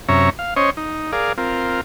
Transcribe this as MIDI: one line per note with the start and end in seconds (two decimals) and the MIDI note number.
0.09 0.30 42
0.09 0.30 48
0.09 0.30 61
0.09 0.30 73
0.09 0.30 76
0.09 0.30 82
0.39 0.54 77
0.56 0.70 61
0.56 0.70 72
0.56 0.70 73
0.56 0.70 75
0.77 1.12 63
1.12 1.33 68
1.12 1.33 70
1.12 1.33 74
1.12 1.33 77
1.38 1.81 60
1.38 1.81 65
1.38 1.81 70